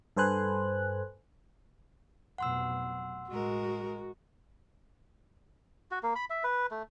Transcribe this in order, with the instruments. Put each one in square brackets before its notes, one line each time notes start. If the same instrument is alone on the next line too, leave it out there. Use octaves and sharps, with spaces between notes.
[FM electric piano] G2 A4 B4 C5 G#5 F#6
[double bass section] F1 B2 F#3 [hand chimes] F#5 C6 E6
[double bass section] A1 [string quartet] G#3 A#4 [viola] F#4
[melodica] F#4
A#3
B5
E5
B4
A3